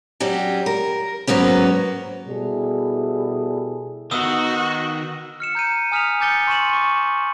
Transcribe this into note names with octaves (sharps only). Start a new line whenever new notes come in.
F#3 G3 C#4 G4
A#4
G#2 F#3 A#3 B3 C#4
B2 G3 E4 G#4 A4
D#3 B3 F#4 D#6 E6
F6 C#7 E7
A#5 G6 C#7 D#7
G#5 D#6 F6 B6 E7 F7
G#5 D6 G6 A6 C#7 G7
C6 C#6 A6 D#7 E7 F#7
C#6 D6 E7